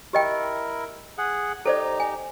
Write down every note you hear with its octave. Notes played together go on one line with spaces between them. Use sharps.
E4 G4 A#4 D#5 G5
G#4 F#5
D#4 G4 A4 C5 D5 A#5
G#5